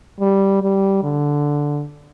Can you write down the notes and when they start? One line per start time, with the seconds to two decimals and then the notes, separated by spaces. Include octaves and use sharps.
0.20 G3
0.62 G3
1.03 D3